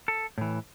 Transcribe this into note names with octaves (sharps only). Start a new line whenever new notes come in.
A4
A2 E3